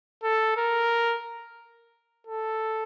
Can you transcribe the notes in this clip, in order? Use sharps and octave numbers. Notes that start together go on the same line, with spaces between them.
A4
A#4
A4